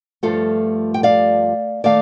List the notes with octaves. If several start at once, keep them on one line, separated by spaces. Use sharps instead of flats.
G2 F3 A3 F4 A4
G5
D5 F5
D#3 A3 D5 F5